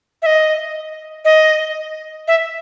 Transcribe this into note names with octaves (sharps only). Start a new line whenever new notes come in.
E5
D#5
D#5
E5